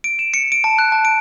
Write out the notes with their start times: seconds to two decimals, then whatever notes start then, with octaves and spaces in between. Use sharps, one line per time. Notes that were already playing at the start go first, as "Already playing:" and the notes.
0.04 D7
0.19 E7
0.34 C#7
0.52 D7
0.64 A5
0.79 F#6
0.92 A5
1.05 D7